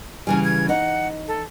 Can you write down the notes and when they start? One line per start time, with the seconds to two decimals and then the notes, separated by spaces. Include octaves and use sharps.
0.27 C#3 E3 G3 G#5
0.44 G#6
0.69 D#4 F#5
1.28 A4